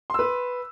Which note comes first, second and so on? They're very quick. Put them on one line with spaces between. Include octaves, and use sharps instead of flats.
C6 E6 B4